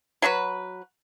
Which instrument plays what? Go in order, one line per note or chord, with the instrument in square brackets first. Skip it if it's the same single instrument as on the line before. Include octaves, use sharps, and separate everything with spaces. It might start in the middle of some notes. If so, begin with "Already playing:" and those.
[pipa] F#3 A3 F#4 B4